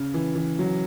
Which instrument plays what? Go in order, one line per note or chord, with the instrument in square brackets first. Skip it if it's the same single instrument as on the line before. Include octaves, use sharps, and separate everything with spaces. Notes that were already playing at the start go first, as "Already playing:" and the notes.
Already playing: [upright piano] C#3
E3
E3
F#3